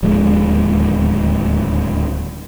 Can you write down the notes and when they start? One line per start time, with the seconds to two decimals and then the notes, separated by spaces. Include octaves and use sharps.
0.03 D1 D#2 F3 G#3